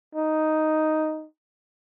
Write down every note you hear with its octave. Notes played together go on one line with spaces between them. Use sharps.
D#4